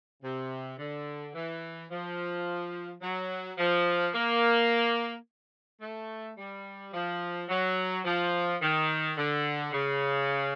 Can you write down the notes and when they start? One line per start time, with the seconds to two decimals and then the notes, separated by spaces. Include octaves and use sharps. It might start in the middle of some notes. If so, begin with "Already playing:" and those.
0.23 C3
0.79 D3
1.34 E3
1.91 F3
3.02 F#3
3.58 F3
4.14 A#3
5.81 A3
6.38 G3
6.93 F3
7.49 F#3
8.05 F3
8.62 D#3
9.17 D3
9.73 C#3